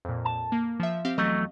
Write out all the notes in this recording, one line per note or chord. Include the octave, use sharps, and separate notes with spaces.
F2 A#2
A5
A#3
F3 E5
C4 G4 F5
E2 F#3 A3 D#5